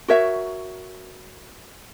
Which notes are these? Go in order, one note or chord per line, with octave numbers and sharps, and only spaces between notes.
F#4 A#4 C#5 E5